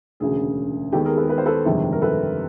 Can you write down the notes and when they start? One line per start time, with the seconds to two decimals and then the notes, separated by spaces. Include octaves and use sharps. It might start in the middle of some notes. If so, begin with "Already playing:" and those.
0.20 E1 D2 C#3 G#4
0.92 D#2 D#3 G#3 B3 G4 A4
1.05 G#4 A#4
1.17 A4 B4
1.29 B4
1.38 C5
1.46 A4 B4
1.65 G1 F2 C3 D#3 G#3
1.92 A#4
2.02 A4 B4